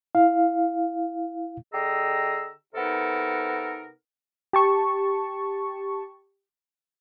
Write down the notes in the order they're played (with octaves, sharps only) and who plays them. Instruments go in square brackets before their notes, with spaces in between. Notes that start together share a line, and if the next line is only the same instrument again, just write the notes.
[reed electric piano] E4 F5
[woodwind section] D3 G4 G#4 D#5 A#5 E6
C3 B3 D#4 A4 A#4
[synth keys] G4 A5 C#6